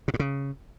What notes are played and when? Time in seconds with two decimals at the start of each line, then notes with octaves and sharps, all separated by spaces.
0.08 C3
0.14 A2
0.19 C#3